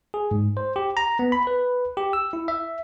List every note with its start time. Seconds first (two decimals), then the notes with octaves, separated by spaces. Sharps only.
0.14 G#4
0.31 G#2
0.57 C5
0.76 G4
0.97 A#5
1.19 B3
1.32 B5
1.47 B4
1.97 G4
2.13 E6
2.33 E4
2.48 E5